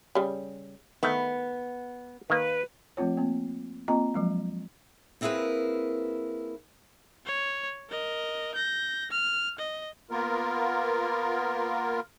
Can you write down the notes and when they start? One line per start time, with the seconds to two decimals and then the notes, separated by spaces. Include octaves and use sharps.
0.15 C#3 G3
1.03 D#3 A3 B3
2.30 D#3 A#3 B4
2.97 F3 A3 C4 F4 C#5
3.17 A#3 C4
3.88 A#3 C4 F4 D#5 A#5
4.14 F3 F#3 G#3
5.21 A#3 C4 E4 G#4 A#4 B4
7.26 C#5
7.90 A#4 D#5
8.55 G6 A#6
9.11 F6
9.59 D#5
10.11 A#3 B3 F4 A#4